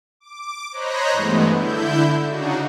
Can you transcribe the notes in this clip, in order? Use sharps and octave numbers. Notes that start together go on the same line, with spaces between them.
D6
C5 C#5 D#5 A#5 B5 F#6
G2 E3 G#3 A3 B3
D3 E4 G6
C#3 D4 D#4 F#4